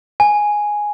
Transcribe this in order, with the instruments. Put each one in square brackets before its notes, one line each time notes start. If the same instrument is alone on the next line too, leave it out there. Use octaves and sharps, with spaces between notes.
[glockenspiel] G#5